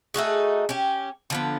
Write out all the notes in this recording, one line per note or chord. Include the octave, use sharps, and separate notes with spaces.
A3 D#4 F#4 G#4
C#4 G4
D3 F3 B3